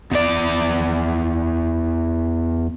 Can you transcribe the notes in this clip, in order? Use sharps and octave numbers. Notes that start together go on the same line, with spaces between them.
E2 D5